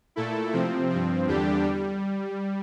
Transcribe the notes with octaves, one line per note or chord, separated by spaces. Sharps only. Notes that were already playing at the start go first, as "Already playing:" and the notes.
A#2 A3 E4 A4
C3 F3 C4
G2 F3 C4
E2 D3 G3 D4 G4
G3